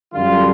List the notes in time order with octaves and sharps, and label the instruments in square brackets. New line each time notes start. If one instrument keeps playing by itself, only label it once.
[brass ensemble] F#2 D3 G3 F4